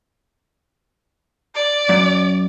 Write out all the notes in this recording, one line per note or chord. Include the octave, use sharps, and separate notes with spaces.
D5
F#2